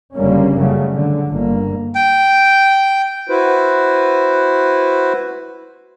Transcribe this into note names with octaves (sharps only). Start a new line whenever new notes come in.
F#1 F2 D3 G3 A#3 C#4
F#2 C#3 F#3 G3 A3
D3
G1 A#3
G5
E4 F#4 B4 C5